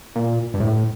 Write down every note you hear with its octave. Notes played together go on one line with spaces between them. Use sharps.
A#2
G2
A2